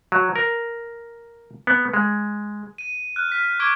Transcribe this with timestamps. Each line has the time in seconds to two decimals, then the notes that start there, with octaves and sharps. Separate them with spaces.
0.12 F#3
0.36 A#4
1.67 B3
1.94 G#3
2.78 D#7
3.16 F6 F#6
3.32 F6 B6
3.59 C#6 D6 G#6 D7 G7